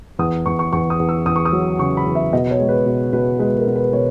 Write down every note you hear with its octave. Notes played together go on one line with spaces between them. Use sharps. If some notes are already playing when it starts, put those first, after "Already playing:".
E2 D#6
E2 C#6
C#6
E2 C#6
D#6
E2
E6
E2 D#6
C#6
D#6
F#3
C#3 C#6
B5
E2
E5
B2 D#5
C#5
G#3
B4
B2
B2 B4
G#3 B4
A#4
B2
B4
B2 C#5